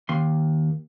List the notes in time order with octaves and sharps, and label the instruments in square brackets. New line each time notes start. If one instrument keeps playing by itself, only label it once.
[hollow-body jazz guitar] D#2 C6